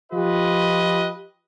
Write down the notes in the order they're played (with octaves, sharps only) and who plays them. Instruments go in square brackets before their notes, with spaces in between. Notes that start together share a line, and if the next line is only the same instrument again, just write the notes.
[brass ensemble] F3 F4 G4 B4 D#5